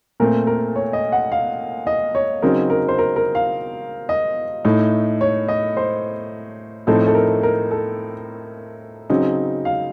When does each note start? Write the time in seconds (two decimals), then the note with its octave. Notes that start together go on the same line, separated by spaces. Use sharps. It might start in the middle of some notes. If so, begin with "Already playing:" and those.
0.20 A#2 A3 C4 A#4
0.47 A#4
0.76 C#5
0.93 D#5
1.12 F#5
1.32 F5
1.87 D#5
2.15 C#5
2.42 C#3 F#3 C4 D#4 A#4
2.70 A#4
2.88 C5
2.99 A#4
3.16 A#4
3.35 F5
4.09 D#5
4.65 A2 A3 D#4
5.21 C#5
5.48 D#5
5.77 C5
6.87 A2 F3 A3 C4 D#4 A4
7.07 A4
7.15 A#4
7.43 A#4
7.71 A4
9.10 C#3 F#3 C4 D#4
9.65 F5